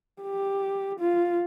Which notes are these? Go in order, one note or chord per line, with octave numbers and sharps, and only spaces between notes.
G4
F4